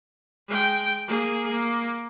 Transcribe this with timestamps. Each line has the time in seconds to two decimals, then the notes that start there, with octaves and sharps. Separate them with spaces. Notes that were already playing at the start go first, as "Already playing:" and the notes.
0.47 G#3 G5
1.08 A#3 G#4
1.50 A#3